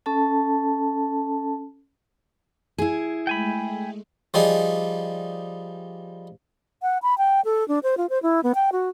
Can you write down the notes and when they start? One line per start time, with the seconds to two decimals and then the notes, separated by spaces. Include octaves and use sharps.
0.06 C#4 A4 A5
2.78 E4 G#4
3.27 G#3 A3 G5 G#5 B5
4.34 F3 G3 D#4 G#4
6.82 F#5
7.02 B5
7.18 G5
7.45 A4
7.68 D4
7.83 C5
7.97 F4
8.10 C5
8.22 E4
8.43 B3
8.55 G5
8.72 F#4